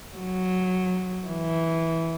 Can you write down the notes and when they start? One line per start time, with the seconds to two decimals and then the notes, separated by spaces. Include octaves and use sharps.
0.16 F#3
1.28 E3